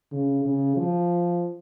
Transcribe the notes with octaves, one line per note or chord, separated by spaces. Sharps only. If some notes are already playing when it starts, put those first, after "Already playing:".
C#3
C#3
F3